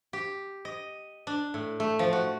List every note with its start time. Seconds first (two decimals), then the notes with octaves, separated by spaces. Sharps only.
0.13 G4
0.65 D#5
1.27 D4
1.54 A2
1.80 A3
1.99 F3
2.13 F#4